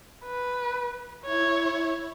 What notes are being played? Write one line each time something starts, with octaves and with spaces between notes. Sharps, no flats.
B4
E4 C#5